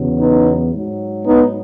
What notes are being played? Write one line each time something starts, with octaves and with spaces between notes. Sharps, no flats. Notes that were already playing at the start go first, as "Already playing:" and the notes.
Already playing: E2 C#3 F#3
B3 D#4
G#2 F#3
B3 D#4